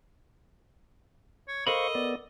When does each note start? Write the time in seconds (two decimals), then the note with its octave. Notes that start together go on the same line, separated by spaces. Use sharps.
1.48 C#5
1.67 A4 A#4 C5 D#5 F5 B5 C#6
1.95 B3 D5